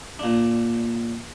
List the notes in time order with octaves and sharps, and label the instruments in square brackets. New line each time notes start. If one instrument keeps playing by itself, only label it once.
[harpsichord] A#2 D4